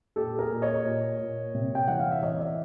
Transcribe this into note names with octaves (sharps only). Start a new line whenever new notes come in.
A#2 G4 A4
G#4 A#4
A#2
C#5 D#5
A#2
A#2
C3
G5
E3 F#5
F5
E5
E3 C#5 D#5
D5 E5